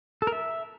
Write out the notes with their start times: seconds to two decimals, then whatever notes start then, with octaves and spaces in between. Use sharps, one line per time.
0.22 A4
0.27 A#4
0.32 E5